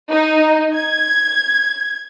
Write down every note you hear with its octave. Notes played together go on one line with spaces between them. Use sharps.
D#4
G#6